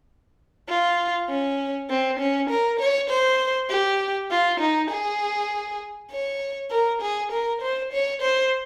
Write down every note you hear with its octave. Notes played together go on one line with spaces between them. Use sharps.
F4
C#4
C4
C#4
A#4
C#5
C5
G4
F4
D#4
G#4
C#5
A#4
G#4
A#4
C5
C#5
C5